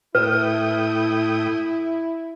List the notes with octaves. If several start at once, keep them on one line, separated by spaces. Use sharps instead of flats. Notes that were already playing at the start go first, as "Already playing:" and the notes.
A2 E4 B4 G5 D#6